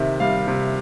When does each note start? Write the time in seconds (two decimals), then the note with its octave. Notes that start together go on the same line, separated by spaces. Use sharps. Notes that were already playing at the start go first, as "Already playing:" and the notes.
Already playing: C3 D#3 E5
0.20 G3 F5
0.47 C3